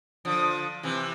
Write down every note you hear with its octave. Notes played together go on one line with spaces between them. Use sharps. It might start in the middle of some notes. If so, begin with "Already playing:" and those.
D3 F3
C3 E3